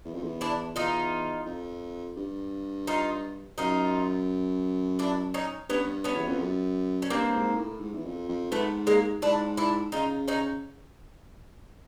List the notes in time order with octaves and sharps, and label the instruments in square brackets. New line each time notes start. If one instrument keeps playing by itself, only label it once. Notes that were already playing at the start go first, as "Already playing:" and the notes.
[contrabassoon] E2
F2
E2
[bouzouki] D4 E4
[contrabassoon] E2 [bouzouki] D#4 F4
[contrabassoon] F2
G2
[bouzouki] D#4 F4
[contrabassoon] F#2 [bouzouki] D#4 F4
[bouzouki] D4 E4
C#4 D#4
[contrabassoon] G2 [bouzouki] B3 C#4
[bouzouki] B3 C#4
[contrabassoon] E2
F2
F#2
[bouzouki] C#4
[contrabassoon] G2 [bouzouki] A#3 C4
[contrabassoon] G#2
A2
G#2
E2
F2
F2
[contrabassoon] G#2 [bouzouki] A3 B3
[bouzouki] G#3 A#3
[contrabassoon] G#2 [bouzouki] D4 E4
[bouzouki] D4 E4
[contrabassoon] C#3 [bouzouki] D#4 F4
[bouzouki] C#4 D#4